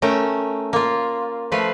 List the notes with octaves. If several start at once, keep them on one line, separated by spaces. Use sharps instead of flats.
A3 C#4 A#4 G5
A#3 F4
F3 A3 B4 F5